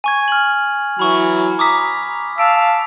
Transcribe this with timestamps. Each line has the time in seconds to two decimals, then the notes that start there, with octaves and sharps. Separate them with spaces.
0.04 G#5 C#6 G#6
0.28 F6 F#7
0.99 E3 F#3 B5 C#6
1.59 A#5 D6 D#6 B6
2.38 F5 A5 E6 B6 D7